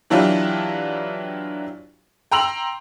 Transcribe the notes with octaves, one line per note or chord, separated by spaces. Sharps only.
E3 F#3 D4 E4 F4 G4
G5 A#5 C6 E6 F7 F#7